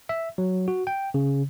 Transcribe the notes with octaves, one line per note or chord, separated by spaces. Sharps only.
E5
F#3
F#4
G5
C#3